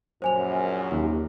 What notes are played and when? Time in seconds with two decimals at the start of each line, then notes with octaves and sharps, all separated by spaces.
0.22 A#1 F#2 C5 G#5 F7
0.91 D#2 G4